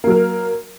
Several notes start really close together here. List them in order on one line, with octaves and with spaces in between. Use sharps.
A#3 F#3 A#4